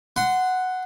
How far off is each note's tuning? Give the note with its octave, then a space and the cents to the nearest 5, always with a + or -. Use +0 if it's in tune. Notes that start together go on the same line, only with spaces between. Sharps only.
F#5 +0 C6 -25